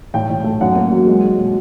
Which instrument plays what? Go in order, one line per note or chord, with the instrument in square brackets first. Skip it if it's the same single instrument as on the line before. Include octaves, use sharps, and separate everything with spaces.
[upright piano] A2 G5
A2
A3
F#2 F#5
A#3
F#3
G#3
G#3
B2